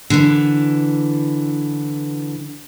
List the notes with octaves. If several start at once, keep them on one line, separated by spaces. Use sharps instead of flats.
D3 E3